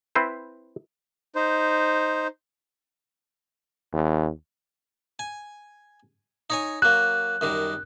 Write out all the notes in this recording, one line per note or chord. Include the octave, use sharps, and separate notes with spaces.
C4 E4 B4 C5
D#4 C5
D#2
G#5
D#4 C#5 G#5
F#3 A#3 F#6
F#2 D#3 G3